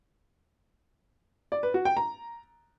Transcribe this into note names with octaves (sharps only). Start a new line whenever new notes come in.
D5
B4
F#4
G5
A#5